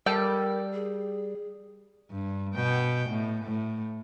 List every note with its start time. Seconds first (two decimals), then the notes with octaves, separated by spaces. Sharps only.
0.06 G3 A4 A#4 G5
0.73 G#4
2.11 G2
2.55 B2 G5
3.10 A2
3.45 A2